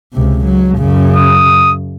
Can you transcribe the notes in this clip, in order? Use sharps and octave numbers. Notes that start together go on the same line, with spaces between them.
C#2 C3
F#3
F#2 C#3
D#6